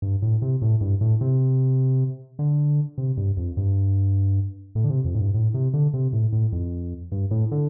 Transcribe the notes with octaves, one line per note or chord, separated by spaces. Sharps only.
G2
A2
C3
A2
G2
A2
C3
D3
C3
G2
F2
G2
A2
D3
C3
F2
A2
G2
A2
C3
D3
C3
A2
A2
F2
G2
A2
D3